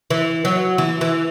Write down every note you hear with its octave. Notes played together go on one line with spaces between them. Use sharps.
E3
F#3
E3
E3